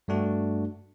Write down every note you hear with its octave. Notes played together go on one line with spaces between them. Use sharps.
G2 A3 D4 F#4